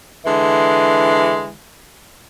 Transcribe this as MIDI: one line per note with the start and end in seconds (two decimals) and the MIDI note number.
0.25 1.50 50
0.25 1.50 52
0.25 1.50 56